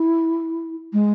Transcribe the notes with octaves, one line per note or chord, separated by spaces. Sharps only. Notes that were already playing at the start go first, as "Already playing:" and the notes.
Already playing: E4
G#3